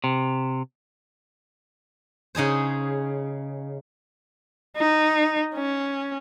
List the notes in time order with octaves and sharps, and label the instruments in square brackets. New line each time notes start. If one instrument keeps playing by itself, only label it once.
[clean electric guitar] C3
[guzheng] C#3 D#4 G#4 C5
[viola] D#4
C#4